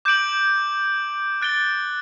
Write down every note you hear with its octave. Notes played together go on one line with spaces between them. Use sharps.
D6 G6 D7 F#7
F#6 A6 D7 G7